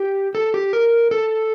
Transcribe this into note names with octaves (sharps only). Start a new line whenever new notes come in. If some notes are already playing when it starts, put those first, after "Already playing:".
Already playing: G4
A4
G4
A#4
A4